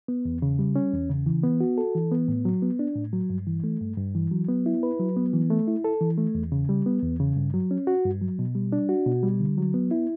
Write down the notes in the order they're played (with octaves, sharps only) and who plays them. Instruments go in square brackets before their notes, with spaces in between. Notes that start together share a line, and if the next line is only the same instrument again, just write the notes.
[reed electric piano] B3
E2
C#3
G3
C#4
E2
C#3
E3
B3
F#4
A4
E3
B3
A2
F#3
B3
D4
A2
F#3
G2
E3
A3
G2
G2
E3
F#3
B3
E4
B4
F#3
B3
E3
A3
E4
A4
E3
A3
E2
C#3
G3
B3
E2
C#3
G2
F#3
C#4
F#4
G2
F#3
B2
G3
D4
F#4
B2
G3
D3
F#3
B3
E4